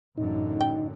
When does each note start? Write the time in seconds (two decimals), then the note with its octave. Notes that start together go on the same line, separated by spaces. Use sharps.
0.17 A1 F#2 D3 D#4
0.61 G5